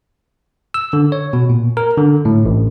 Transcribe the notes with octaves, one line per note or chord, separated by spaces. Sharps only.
E6
D3
C#5
B2
A#2
A#4
D3
A2
A1